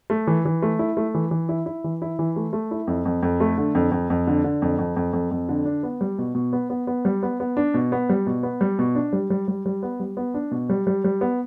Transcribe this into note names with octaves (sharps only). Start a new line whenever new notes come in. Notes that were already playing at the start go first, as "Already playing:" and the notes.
A3
E3
E3
A3
E4
A3
E3
E3
E4
E4
E3
E4
E3
A3
A3
E4
F2
F2
F2
A3
D3
F2
F2
F2
D3
D3
F2
F2
F2
F2
F2
D3
D4
B3
G3
B2
B2
B3
B3
B3
G3
B3
B3
D4
B2
B3
G3
B2
B3
G3
B2
D4
G3
G3
G3
G3
B3
G3
B3
D4
B2
G3
G3
G3
B3